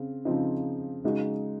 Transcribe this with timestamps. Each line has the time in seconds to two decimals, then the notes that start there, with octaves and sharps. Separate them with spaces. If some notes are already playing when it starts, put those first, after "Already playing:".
Already playing: C#3 C4
0.25 C#3 F3 C4 D#4
1.04 C#3 G#3 D#4 F#4